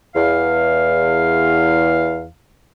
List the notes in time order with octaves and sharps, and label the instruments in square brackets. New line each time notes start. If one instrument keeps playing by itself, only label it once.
[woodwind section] E2 F5